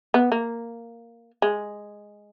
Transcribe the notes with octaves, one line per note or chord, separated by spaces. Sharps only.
B3
A#3
G#3